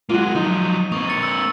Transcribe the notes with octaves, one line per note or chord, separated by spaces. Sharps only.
G#3 A#3 F4 F#4 D#7
F3 F#3 D#4
A#3 C4 C#6 D#6
A6 C#7
E6